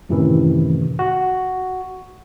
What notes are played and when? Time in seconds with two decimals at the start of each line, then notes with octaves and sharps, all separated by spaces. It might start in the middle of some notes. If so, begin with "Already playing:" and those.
0.09 F#2 A2 C3 D#3 E3
0.99 F#4